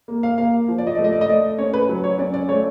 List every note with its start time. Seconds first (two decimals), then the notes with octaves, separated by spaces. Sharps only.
0.08 A#3
0.23 F5
0.38 A#3 F5
0.68 F3
0.78 D5
0.87 D#5
0.95 A3 D5
1.04 D#5
1.13 D5
1.21 D#5
1.29 A3 D5
1.58 C#4 C#5
1.74 B4
1.89 F#3
2.04 C#5
2.18 C#4 D5
2.34 D5
2.49 A3 C#5